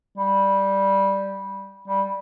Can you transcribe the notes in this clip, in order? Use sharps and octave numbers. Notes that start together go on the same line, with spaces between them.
G3
G3